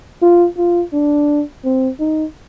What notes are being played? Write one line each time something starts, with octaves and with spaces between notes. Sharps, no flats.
F4
F4
D4
C4
D#4